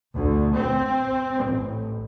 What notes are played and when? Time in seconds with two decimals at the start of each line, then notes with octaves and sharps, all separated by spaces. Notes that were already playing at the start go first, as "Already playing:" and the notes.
0.14 D2
0.55 C4
1.43 A1